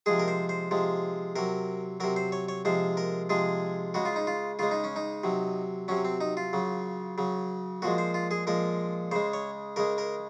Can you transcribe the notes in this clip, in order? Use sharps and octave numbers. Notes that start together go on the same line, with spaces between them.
C3 F3 G#3 G#4
A#4
C5
C5
C3 F3 G#3
C3 F#3 A#4
C3 F#3 A#4
C5
C#5
C#5
C3 F3 G#3 C5
A#4
C3 F3 G#3 G#4
C#3 G#3 F#4
F4
D#4
F4
C#3 G#3 F4
D#4
C#4
D#4
C3 F#3
C3 F#3 C#4
C4
D#4
F4
C#3 F#3
C#3 F#3
A#2 F3 G#3 F#4
C5
F4
G#4
A#2 F3 G#3 A#4
C#3 G#3 C5
C#5
C#3 G#3 A#4
A#4